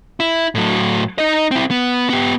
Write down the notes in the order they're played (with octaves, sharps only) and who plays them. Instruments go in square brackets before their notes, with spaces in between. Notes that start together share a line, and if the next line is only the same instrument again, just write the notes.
[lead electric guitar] E4
A2 F#3
D#4 D#5
C4 E4
B3
B3 G4